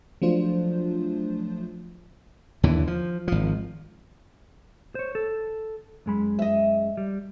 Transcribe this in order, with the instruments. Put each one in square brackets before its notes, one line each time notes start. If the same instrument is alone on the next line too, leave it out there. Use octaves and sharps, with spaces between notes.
[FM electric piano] F3 F#3 A3 D4 F4 C5
[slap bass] D#2 D3 E3
F3
G#1 F3
[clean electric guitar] C5 C#5
A4
F#2 G#3 B5
[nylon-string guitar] D#5 E5
[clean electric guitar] G3